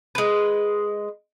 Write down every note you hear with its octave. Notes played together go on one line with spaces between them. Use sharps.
G#3 B4